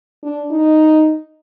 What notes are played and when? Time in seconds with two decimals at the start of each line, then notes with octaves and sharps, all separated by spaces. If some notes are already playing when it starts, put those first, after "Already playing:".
0.23 D4
0.51 D#4